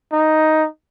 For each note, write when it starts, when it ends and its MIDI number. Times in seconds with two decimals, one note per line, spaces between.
0.13 0.67 63